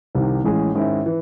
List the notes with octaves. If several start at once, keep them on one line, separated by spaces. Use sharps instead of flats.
C2 C3 D#3
A1 A2 G#3 C#4 G#4
G#2 D#3 G#3 C#4 E4
E3